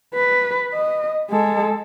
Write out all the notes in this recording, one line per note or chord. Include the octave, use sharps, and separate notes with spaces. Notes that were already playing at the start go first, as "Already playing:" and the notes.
B4
D#5
G#3 A4